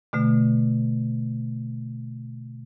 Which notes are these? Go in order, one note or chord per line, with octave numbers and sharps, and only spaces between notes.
B2 D3 A3